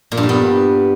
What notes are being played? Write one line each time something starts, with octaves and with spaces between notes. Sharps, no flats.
A#2
G2
G3
B3